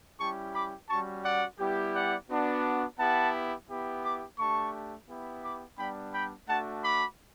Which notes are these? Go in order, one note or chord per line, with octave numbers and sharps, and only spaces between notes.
G3 C#4 E4 G4 A5 C#6
B5 D6
G3 C#4 F#4 A5 C#6
D5 F#5
G3 B3 E4 G4
D5 F#5
B3 D4 F#4
B3 E4 G4 F#5 A5
B3 E4 G4
B5 D6
A3 D4 G4 A5 C#6
B3 E4 G4
B5 D6
G3 B3 D4 G5 B5
G5 B5
A3 D4 F#4 F#5 A5
B5 D6